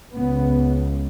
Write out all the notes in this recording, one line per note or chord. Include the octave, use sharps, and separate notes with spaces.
C#2 C#3 B3